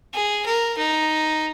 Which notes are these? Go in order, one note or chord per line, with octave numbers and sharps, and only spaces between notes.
G#4
A#4
D#4